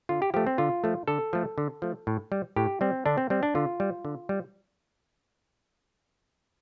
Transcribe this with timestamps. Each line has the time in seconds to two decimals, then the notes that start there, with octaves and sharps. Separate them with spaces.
0.09 D3 F4
0.22 G4
0.34 F3 A3 G4
0.47 C4
0.58 D3 F4
0.84 F3 A3
1.08 D3 A4
1.33 F3 A3
1.58 D3
1.82 F3 A3
2.07 A2
2.32 G3
2.56 A2 G4
2.81 G3 C4
3.06 D3 D4
3.18 C4
3.30 G3 C4
3.43 D4
3.55 D3 F4
3.80 G3
4.05 D3
4.29 G3